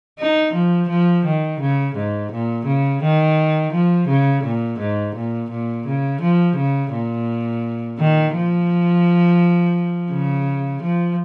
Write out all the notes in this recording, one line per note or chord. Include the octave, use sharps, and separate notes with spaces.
D#4
F3
F3
D#3
C#3
G#2
A#2
C#3
D#3
F3
C#3
A#2
G#2
A#2
A#2
C#3
F3
C#3
A#2
D#3
F3
C#3
F3